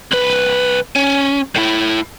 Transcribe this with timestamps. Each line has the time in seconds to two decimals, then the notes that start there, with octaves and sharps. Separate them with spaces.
0.11 C2 B4
0.96 C#4
1.56 A2 E4